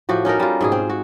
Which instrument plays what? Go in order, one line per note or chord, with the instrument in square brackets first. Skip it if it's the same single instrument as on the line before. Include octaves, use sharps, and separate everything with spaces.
[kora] A2 F3 F#4 G4
C#4 D#4 A4 A#4
G3 F4
G#2 B2 G#4
C4
F#4